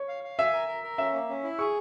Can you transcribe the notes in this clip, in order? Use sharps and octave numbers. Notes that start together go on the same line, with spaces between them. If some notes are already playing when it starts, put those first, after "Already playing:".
Already playing: C#5
F5
F5
E5 G#5
A#4
A#4
A#4
C#4 E5
A#3
C#4
E4
G#4 C#6